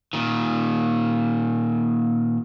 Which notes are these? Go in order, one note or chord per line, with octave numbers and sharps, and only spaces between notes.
A#2 D#3